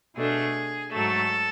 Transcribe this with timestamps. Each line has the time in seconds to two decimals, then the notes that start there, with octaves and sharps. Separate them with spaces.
0.15 B2 A3 D4 G#4
0.91 G#2 F#3 A3 A4